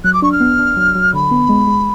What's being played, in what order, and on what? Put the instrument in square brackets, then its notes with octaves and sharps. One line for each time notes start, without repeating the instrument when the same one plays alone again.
[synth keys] F#3 [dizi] F#6
[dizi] D6
[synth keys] D4 [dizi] C#6
[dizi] F6
[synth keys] B3
D4
F#3
F#3
[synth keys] D3 [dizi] B5
[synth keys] B3
G#3
G#3